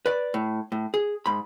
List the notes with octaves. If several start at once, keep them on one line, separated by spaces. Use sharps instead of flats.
B4 D5
A2
A2
G#4
G#2 B5